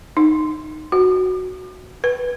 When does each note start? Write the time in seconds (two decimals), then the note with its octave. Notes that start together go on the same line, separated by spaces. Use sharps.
0.17 D#4
0.92 F#4
2.04 B4